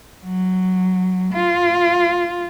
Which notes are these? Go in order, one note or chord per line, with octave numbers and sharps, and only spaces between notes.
F#3
F4